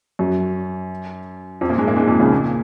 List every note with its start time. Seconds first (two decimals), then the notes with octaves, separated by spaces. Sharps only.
0.19 F#2 F#3
1.61 F2 F3
1.69 A#2 A#3
1.78 G#2 G#3
1.88 A#2 A#3
1.96 G#2 G#3
2.08 F2 F3
2.19 C#2 C#3
2.32 A#2